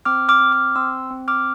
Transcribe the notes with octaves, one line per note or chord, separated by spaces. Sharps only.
C4 D6 F6
D6 F6
C4
D6 F6
C4 C6 E6
C4
D6 F6